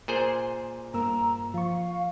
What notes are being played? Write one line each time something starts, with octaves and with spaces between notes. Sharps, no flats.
A#2 G#4 C5
G2 A#3 A#5 E6
F3 F5 C#6